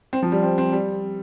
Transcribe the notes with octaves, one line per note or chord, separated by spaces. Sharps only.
C4
F3
G3
C4
C4
G3